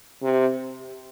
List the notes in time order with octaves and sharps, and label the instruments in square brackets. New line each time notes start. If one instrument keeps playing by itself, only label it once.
[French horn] C3